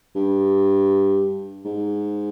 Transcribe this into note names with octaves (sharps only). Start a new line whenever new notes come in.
G2
G#2